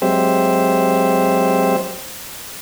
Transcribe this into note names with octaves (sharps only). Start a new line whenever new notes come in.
F#3 G#3 C4 G4 C5 E5